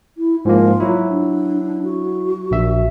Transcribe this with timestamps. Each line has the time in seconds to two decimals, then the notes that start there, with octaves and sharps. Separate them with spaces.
0.17 E4
0.45 G#2 F3 A#3 F4
0.80 F#3 E4
1.09 D4
1.84 F#4
2.51 A#1 E5